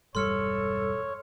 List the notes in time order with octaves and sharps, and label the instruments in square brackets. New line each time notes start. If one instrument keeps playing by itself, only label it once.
[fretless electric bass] E1 G2 G3 [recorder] A4 [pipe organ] C#5 [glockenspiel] C6 F6 C#7